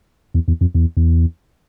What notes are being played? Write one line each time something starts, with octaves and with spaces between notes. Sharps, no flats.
E2
E2
F2
E2
E2